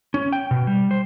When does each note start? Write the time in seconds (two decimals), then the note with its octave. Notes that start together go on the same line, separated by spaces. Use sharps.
0.14 C#4
0.33 G5
0.51 B2
0.67 G3
0.91 C5